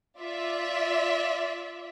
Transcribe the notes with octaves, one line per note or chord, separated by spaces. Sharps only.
F4 D5 E5